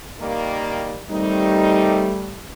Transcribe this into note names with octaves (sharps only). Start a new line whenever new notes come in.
D#3 G3 A#3
D#3 G3 A3 C4 D#4